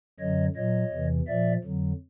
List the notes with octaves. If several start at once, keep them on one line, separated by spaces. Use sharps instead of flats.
F#2 D3 F#3 C#5 D#5
A#2 F#3 C#5 D#5
E2 C3 E3
A#2 F3 D5 E5
F2 D3 F#3